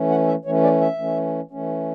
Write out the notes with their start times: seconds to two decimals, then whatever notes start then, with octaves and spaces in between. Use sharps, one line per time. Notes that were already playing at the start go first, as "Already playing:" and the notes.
Already playing: E3 A3 C#4
0.10 F#5
0.28 E5
0.45 E3 A3 C#4 C#5
0.63 D5
0.81 E5
0.99 E3 A3 C#4
1.51 E3 A3 C#4